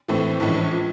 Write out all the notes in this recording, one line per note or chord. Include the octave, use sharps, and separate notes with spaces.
A2 E3 A3 C4 E4
A#1 A2 E3 G#3 C#4
F3